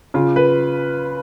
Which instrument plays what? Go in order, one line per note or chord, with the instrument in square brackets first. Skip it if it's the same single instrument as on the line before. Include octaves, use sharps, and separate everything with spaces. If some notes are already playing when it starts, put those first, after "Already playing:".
[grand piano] C#3 F4
B4